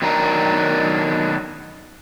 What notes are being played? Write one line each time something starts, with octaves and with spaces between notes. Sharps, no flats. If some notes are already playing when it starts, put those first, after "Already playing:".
B2 D#3 F#3 D4 A#5